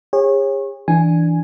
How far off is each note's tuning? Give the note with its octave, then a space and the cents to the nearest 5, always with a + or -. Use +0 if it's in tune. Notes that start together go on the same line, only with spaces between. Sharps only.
G#4 -40 C#5 -25
E3 +0 D4 +0 G#5 +0